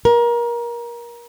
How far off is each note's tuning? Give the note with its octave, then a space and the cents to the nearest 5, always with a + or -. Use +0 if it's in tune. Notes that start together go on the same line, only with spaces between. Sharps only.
A#4 +25